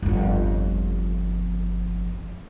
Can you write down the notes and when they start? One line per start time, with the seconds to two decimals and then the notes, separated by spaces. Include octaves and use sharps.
0.02 G1 F2